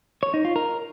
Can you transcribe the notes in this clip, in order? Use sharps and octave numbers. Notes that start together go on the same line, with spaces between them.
C#5
D#4
F4
A#4